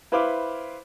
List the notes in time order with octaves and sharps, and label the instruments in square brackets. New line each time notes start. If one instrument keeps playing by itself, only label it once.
[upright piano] E4 B4 C5 F5 D6